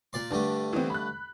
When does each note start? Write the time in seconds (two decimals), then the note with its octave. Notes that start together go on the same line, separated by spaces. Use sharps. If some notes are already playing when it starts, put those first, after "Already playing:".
0.13 A#2 D5 C6
0.31 G2 D3 A3 D4
0.73 E3 B3 C4
0.90 B5 F#6